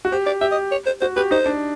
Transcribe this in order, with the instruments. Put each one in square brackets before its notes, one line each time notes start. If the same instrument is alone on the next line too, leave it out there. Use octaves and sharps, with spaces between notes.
[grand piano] F#4
[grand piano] G4 [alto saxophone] C5
[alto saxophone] D5
[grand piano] G4 [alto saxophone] E5
[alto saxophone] D#5
C#5
C5
[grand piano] F#4 [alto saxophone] C5
[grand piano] G4 [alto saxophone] B4
[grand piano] D#4 [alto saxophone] C5
[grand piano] D4